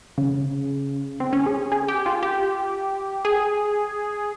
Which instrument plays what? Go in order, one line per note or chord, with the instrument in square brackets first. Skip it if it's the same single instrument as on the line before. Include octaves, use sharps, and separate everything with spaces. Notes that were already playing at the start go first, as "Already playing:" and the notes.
[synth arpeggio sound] C#3
C4
C#4
G#4
G#4
G4
F4
G4
G#4